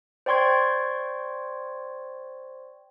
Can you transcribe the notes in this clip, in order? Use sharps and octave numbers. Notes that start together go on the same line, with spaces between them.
C5 D5 G5 C6 C#6 G#6